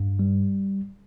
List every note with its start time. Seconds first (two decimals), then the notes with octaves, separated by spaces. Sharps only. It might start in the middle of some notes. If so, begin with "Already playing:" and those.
Already playing: G2
0.19 G3